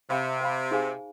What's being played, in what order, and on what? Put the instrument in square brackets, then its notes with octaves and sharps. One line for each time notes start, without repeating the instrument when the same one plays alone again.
[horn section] C3 [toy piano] C5 F5 B5
[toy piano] C5 F5 B5
D#4 G#4 C5 F5 G#5